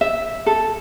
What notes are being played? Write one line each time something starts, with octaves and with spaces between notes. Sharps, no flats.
E5
A4